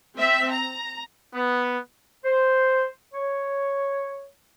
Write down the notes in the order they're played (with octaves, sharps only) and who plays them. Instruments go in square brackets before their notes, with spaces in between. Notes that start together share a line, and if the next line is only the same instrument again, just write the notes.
[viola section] C4 E5
A#5
[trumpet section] B3
[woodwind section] C5
C#5